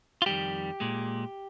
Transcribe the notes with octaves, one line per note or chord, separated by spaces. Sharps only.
F4
F2 D#3 G3 G4
A#2 G#3